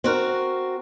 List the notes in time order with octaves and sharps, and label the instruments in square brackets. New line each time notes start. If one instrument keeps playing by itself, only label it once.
[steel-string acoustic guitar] C4 F#4 A#4